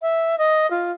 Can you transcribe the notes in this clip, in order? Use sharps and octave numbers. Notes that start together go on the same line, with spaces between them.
E5
D#5
F4